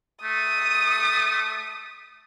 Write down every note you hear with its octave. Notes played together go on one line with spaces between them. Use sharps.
A3 D#6